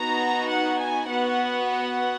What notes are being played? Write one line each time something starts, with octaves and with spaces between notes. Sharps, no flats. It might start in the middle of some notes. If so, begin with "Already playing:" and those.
Already playing: B3 D#4 F#4 A#5
F#5
G#5
B3 F#4 F#5
F#5